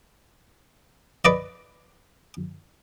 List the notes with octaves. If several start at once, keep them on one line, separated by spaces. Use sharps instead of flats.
B4 D5 D#5